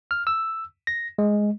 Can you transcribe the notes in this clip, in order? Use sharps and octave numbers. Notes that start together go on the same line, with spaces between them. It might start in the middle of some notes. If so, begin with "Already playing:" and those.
F6
E6
A#6
G#3